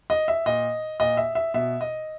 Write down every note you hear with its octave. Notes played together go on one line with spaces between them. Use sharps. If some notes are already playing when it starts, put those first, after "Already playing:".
D#5
E5
A#2 D#5
A#2 D#5
E5
E5
B2 E5
D#5